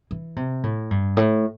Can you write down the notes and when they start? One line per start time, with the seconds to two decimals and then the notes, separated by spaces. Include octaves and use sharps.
0.11 E3
0.36 C3
0.63 A2
0.91 G2
1.17 A2